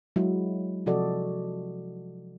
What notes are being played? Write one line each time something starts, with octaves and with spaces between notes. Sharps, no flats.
F#3 G#3 E4
C3 F3 F#4 A4 D5 D#5